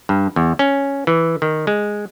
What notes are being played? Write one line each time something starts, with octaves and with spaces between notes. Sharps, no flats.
G2
E2
C#4
E3
D#3
G#3